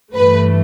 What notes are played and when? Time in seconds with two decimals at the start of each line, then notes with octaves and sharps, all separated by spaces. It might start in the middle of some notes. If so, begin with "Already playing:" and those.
0.14 G2 E3 A3 B4